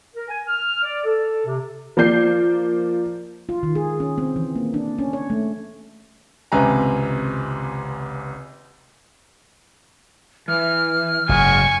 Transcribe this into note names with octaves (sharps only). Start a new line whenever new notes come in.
A#4
G#5
F6
D5
A4
C3
F3 A#3 D5 G6 C7
F4
D#3
G#4
C#4
C4
E3
A#3
D4
C#4
C#5
A3
G#1 C#2 C3 B4 G#5 A#5
E3 F6
F#1 G#2 F#4 G#4 F#5 G#5 C#6